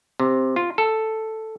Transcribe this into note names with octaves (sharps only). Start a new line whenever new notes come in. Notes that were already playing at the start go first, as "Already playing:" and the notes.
C3
F4
A4